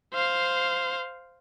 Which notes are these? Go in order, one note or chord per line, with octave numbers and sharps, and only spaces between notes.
C5 F5